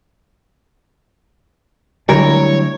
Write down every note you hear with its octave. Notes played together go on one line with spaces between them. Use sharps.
D3 F#3 G3 A3 E4 A#4 C#5